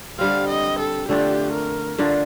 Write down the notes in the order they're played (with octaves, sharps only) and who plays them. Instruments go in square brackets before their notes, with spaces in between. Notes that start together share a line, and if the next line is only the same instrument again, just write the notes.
[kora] D3 G3 C4 [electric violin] F5
[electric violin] D#5
A4
[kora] D3 A3 D4 F4 [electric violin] G4
[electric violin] A#4
[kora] D3 A3 D4 F4